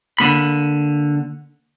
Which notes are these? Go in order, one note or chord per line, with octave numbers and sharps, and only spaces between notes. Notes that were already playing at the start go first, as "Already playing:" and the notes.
D3 A#3 B5